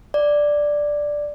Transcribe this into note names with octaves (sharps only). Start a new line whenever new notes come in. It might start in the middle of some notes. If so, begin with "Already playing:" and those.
D5